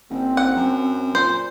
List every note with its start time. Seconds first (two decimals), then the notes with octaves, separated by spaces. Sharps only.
0.10 F#1 C4
0.37 F#5
0.56 F#2
1.15 A#2 C5